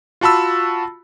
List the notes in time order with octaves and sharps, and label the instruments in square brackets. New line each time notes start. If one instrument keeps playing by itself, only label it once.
[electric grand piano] F4 F#4 A5 B5 E6